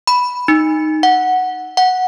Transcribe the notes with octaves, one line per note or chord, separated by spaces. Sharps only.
B5
D#4
F#5
F#5